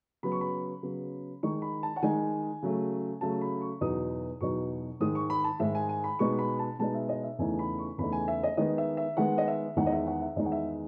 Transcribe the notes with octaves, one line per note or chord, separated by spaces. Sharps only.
C#3 F#3 B3 B5
C#6
B5
C#3 F#3 B3
D#3 G#3 D#4 C#6
B5
A5
F#5
D#3 G#3 D#4 G#5
C#3 F#3 A3
C#3 F#3 A3 A5
B5
C#6
E2 B2 F#3 B3 D#4 D#6
E2 B2 F#3 B3 D#4 C#6
G#2 D#3 G#3 D#6
C#6
B5
A5
G#2 D#3 G#3 E5
G#5
G#5
B5
B2 G#3 B3 D#4 C#6
B5
A5
B2 G#3 B3 D#4 A5
E5
D#5
E5
E2 C#3 E3 A3 D#4 G#5
B5
C#6
E2 C#3 E3 A3 D#4 B5
G#5
E5
D#5
D#3 G#3 B3 D#5
E5
E5
D#3 G#3 B3 F#5
D#5
E5
E2 D#3 G#3 D#4 F#5
D#5
E5
F#5
E5
E2 D#3 G#3 D#4 D#5
F#5
E5